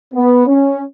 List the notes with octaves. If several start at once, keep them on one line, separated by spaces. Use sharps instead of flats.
B3
C#4